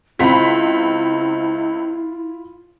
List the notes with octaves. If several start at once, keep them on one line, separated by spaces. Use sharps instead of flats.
C#2 C4 E4 F4 B5 B6